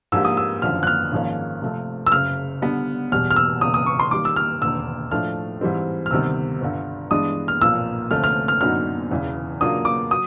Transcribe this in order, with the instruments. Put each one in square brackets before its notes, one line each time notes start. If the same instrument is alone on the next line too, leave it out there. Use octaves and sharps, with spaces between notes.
[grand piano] G#2 F3 A#3 D4 G4 [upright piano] E6
[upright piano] D#6
E6
[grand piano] G#1 F#2 D3 F3 [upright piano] F6
[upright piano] F#6
F6
[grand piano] G#1 G#2 F3 A#3 C#4
C3 F3 A3 C4
[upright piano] E6
[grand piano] F#1 F#2 C#3 [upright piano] F6
[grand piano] D3 G3 B3 D4
[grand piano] E1 E2 B2 G3 [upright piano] F6
[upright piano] F6
E6
[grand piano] E1 E2 C#3 [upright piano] D#6
[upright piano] D#6
C#6
C6
[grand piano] D#3 G3 A#3 [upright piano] D6
[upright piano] E6
F6
[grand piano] E1 D#2 D3 [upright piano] E6
[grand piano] A2 F3 A3 D4 [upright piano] F6
[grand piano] G#2 E3 G3 C4
[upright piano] F6
[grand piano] D2 C3 D#3 G3 B3 [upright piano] E6
[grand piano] G1 G2 D3
[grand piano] G2 E3 G#3 B3 D4 [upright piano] D#6
[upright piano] F6
[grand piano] B1 A#2 F3 A#3 [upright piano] E6
[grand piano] D2 C3 F3 A3 C#4 [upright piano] F6
[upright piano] F6
F6
[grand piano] F#2 D3 F#3 B3 D#4 [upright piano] F6
[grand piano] E1 E2 C#3 E3
[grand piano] C#3 F#3 A#3 D4 F4 [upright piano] D#6
[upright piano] D6
[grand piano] F#3 [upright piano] D#6